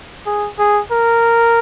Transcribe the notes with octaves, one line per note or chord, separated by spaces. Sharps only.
G#4
G#4
A#4